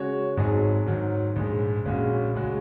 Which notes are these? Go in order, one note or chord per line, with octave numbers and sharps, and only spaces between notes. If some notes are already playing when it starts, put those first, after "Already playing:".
Already playing: C#3 G#3 F#4 C#5
G#1 G#2 F#3 D#4 G#4
G#2 D#3 F#3
A#1 G#2 G#3
A#1 A#2 G#3 C#4 F#4
C#2 C#3 G#3 F#4